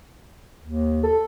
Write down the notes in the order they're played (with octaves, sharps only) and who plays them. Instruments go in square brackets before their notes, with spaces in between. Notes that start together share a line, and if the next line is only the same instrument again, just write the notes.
[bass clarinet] D#2
[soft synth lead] A4